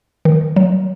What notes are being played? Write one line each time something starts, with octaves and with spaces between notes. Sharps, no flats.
D#3
F#3